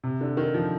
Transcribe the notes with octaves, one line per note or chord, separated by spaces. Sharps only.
C3
D3
D#3
F3